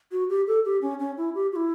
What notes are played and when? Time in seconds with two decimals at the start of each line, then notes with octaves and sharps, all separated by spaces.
0.12 F#4
0.30 G4
0.47 A4
0.65 G4
0.82 C#4
0.99 C#4
1.18 E4
1.35 G4
1.52 F#4
1.56 E4